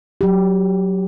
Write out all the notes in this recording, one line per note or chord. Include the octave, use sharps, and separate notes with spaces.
F#3 G4